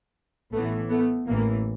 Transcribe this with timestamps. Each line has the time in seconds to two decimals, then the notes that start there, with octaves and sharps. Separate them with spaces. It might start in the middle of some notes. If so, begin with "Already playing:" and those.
0.53 A1 A2 E3 A3 B3
0.90 A3 B3
1.27 A1 A2 E3 A#3